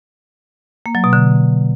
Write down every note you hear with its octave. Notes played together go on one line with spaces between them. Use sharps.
A#3
F#3
B2
D3